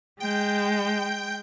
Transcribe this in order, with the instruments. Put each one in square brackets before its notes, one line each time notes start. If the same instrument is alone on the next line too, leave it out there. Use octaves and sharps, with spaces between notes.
[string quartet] G#3 [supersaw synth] G5 G6